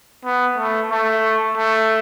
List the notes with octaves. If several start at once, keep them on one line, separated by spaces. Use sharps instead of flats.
B3
A3
A3
A3